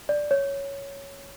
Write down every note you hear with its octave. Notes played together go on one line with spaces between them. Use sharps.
D5
C#5